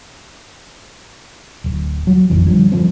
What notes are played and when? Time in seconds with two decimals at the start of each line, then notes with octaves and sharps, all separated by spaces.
1.64 D1
2.07 F#3
2.30 A1 F2 E3
2.46 D3 F3 G3
2.72 G2 F3 C4